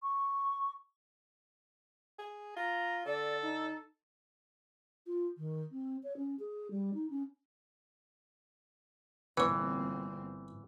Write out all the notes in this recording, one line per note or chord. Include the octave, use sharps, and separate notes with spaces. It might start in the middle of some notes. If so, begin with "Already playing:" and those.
C#6
G#4
F4 A#5
D3 A4 D5
D#4
F4
D#3
C4
C#5
C#4
G#4
G3
D#4
C#4
G1 A#2 E3 B3 C4 C#5